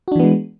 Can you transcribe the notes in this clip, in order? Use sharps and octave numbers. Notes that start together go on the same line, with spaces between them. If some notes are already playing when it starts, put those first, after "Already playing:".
E3 G#3 B3 D4 F#4